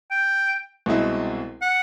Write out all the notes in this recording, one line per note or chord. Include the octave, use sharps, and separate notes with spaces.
G5
C2 B2 G#3 C4 E4
F#5